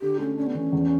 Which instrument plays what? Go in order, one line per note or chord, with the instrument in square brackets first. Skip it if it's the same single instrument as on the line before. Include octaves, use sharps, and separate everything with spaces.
[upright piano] D3 [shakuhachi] G4
[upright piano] A3 [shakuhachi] C#4
[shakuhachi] C#4 [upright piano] D4
[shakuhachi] B3
[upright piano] E3 [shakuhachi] C#4
[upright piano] E2